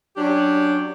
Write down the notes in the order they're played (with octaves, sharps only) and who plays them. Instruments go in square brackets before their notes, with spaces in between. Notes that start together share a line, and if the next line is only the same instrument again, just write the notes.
[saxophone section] F#3 C#4 D4 G4